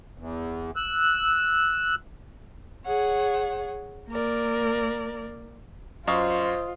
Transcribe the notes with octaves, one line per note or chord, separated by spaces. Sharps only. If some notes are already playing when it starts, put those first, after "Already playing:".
E2
E6 F#6
G#4 C#5 F#5
A#3 A#4 D5
F#2 F4 C5 D#5 F5 C#6